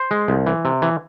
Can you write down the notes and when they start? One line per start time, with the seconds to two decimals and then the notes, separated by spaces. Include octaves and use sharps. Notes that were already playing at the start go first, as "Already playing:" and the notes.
Already playing: C5
0.11 G#3
0.28 C2
0.47 E3
0.65 C3
0.82 E3